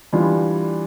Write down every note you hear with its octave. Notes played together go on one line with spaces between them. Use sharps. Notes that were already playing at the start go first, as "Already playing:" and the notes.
E3 G3 D4 F4